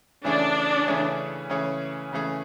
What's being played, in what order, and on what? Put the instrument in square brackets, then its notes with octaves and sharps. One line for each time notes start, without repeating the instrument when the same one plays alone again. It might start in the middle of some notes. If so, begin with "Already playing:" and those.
[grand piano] C#3 E3 A3 C#4 G#4 [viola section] D4
[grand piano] C#3 E3 A3 C#4 G#4
C#3 E3 A3 C#4 G#4
C#3 E3 A3 C#4 G#4